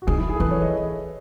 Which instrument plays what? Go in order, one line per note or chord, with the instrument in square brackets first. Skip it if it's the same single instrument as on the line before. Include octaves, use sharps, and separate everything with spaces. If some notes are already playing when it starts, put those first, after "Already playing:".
[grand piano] F#4
[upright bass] D#3 [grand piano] G#4
[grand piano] E4
G#4
A4
[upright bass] E3 [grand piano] B4
[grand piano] C#5
D#5